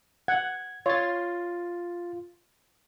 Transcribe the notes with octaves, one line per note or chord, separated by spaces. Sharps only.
F#5 G#6
F4 C#5 A6